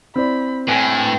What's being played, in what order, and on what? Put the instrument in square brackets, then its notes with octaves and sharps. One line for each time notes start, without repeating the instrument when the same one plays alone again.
[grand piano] C4 E4 D5 [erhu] B5
[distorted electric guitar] A2 [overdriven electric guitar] B4 G5 [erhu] G#5